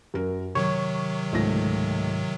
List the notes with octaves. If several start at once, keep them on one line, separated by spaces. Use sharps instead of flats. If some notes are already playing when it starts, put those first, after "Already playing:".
F#2 A#4
C3 D#3 F#3 C#5 C#6
C#2 G#2 A3 A#6